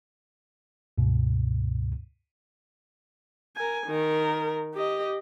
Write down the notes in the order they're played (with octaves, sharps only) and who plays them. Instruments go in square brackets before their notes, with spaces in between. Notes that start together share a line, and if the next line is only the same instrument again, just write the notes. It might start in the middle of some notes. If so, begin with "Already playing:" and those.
[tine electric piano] C#2 G2 B2
[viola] A#4 G#5
D#3 A#4
G4 D#5